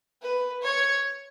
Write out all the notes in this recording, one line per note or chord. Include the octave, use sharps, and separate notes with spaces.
B4
C#5